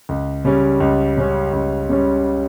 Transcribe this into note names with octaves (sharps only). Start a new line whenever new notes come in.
C#2
C#3 G3 C#4
C#2
C#3 G3 C#4
C#2
C#3 G3 C#4